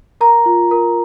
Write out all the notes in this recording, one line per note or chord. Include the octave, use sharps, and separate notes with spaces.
A#4 A#5
F4
A#4